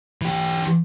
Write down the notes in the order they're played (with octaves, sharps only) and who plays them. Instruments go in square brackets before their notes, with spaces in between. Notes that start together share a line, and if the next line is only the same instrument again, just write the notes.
[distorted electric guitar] E3 G4